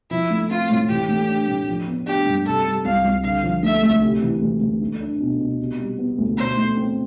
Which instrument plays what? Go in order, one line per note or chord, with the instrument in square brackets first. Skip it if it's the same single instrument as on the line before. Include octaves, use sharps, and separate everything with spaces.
[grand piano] F3 [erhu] E4
[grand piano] A3
[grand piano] C4 [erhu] F4
[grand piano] A2
[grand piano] E3 [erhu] G4
[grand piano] A3
D4
A2
F3
B3
[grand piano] D4 [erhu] G4
[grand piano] G2
[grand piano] C3 [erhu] A4
[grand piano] G3
[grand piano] C2 [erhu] F5
[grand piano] C2
[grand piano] D3 [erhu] F5
[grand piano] F3
[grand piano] A3 [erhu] E5
[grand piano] D2
C3
E3
D2
D2
A3
D4
B2
B2
C3
G3
B3
D2
[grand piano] B2 [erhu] C5
[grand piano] A3
C4